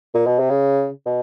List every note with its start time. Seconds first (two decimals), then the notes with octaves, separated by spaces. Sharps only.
0.14 A#2
0.26 B2
0.39 C3
0.50 C#3
1.06 B2